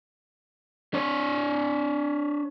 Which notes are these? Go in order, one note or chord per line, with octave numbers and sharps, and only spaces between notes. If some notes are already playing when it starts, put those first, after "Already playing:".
D4 C#5